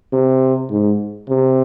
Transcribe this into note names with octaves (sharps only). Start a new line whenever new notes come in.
C3
G#2
C3